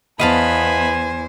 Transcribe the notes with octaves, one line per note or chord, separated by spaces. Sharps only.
E2 B3 C5 D#5 F5 G#5 A5 B5